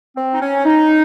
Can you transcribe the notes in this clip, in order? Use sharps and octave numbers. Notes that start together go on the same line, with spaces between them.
C4
D#4
C#4
D#4